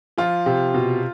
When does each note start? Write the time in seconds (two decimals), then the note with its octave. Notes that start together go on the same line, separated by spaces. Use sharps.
0.18 F3 F4
0.46 C3
0.74 B2